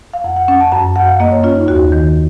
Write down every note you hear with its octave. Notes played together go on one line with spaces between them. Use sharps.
F5
F2 F#5
F#5
C#4 F#5
A5
F#2 A5
F#2 F#5
F5
A#3 D#5
C#5
C#4 F4
D#4
D#2 F#4
D#3